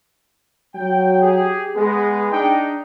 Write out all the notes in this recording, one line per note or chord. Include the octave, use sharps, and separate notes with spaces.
F#3 G5
G4 G#4
G#3 B3 G#4
D4 D#4 G5